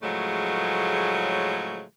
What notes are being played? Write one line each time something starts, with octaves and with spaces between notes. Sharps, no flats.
A2 C#3 F3 F#3 G#3 A3